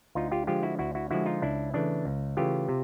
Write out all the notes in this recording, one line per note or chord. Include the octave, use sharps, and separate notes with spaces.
D2 D#4 F4
F4 G4
D3 F3 G#3 F4 G4
E4 F#4
D2 E4 F#4
E4 F#4
D3 F3 G#3 E4 F#4
D#4 F4
C#2 D4 E4
C#3 E3 A3 D4
C#2
C#3 E3 A3 F4 G4
C3